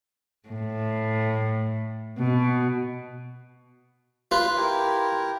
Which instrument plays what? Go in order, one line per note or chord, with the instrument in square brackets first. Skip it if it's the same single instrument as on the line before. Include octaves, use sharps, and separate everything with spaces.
[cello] A2
B2
[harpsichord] F4 B4
[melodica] E4 G4 A#4